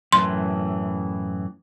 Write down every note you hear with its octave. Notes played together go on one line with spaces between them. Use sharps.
F#2 A2 E3 C6